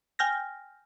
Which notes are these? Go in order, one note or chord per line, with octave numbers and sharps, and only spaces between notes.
G5 G#5 F6 G6 A#6